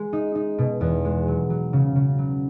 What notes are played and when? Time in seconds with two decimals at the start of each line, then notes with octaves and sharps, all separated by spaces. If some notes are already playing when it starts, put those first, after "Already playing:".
Already playing: G#3
0.13 D#4
0.35 D#4
0.58 B2
0.81 E2
1.05 G#3
1.28 F#3
1.50 F#3
1.73 C#3
1.96 C#3
2.18 F#3